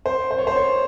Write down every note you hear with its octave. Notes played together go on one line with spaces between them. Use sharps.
C5
C5
C#5
C5
C#5